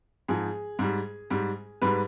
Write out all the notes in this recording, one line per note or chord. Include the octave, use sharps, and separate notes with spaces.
G#2 F3 G#4
G#2 G3
G#2 G3
G#2 G3 B4